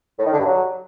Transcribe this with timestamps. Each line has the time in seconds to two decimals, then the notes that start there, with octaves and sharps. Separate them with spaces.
0.19 A2
0.26 D#3
0.33 D3
0.39 G2
0.46 F#3